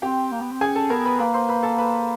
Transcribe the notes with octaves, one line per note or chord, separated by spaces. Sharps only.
C4 G4 G5
A#3
B3
C4
C#4 G#4 G#5
A4 A5
B3 A#4 A#5
B4 B5
A#3 B4 B5
C5 C6
B4 B5
A4 A5
B4 B5